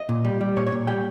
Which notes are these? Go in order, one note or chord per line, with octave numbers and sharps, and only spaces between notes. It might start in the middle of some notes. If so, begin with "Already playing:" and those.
Already playing: D#5
A#2
G3
G3
A#2 C#5
C#5
A#2
G3 G5